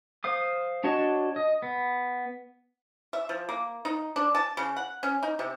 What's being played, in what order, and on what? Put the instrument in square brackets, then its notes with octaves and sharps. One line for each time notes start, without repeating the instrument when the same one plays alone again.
[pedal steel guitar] C5 F5 D#6
D4 F#4 C#5 D#5 A5
D#5
B3
[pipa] E5
F3
A#3
D#4
D4
A5
C#3
F#5
C#4
D#4
C3